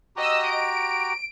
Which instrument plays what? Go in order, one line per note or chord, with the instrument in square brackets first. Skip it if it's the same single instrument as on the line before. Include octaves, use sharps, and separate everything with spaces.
[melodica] F#4 G4 A#5 [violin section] D#5 D#6 E6
[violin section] D7